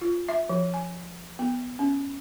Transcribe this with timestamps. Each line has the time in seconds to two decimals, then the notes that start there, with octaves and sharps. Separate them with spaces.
0.01 F4
0.29 E5
0.49 F3
0.74 G#5
1.39 B3
1.79 C#4